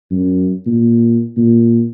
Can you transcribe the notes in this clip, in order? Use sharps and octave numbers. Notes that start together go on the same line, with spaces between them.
F#2
A#2
A#2